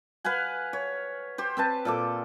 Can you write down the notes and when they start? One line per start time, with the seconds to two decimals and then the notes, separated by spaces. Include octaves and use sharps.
0.24 B4 F5 F#5 G#5
0.73 C#5
1.38 G4 C5
1.57 C4 B4 A5
1.85 A#2 A4 D6